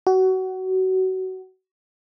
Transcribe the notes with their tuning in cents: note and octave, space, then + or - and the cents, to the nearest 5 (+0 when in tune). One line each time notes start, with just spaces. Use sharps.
F#4 +25